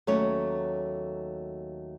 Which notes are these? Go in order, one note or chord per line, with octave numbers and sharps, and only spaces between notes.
D#2 F#3 A3 C#4 C#5